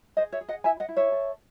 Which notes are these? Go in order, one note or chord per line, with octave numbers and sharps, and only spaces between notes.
G#4 C5 D#5
C#5 E5
G#4
D#5 F#5
E4 E5 G#5
D#5 F#5
E4
C#5 E5
A4